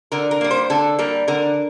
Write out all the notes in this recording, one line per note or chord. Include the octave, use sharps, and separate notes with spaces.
D3 A#4
A#4
G3 A#3
C5
D3 A4
G3 A#3 A#4
D3 A#4